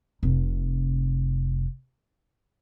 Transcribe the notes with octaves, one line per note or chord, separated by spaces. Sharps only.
F1 C3